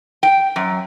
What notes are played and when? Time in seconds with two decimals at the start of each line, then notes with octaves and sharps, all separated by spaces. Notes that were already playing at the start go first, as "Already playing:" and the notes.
0.23 G5
0.56 F#2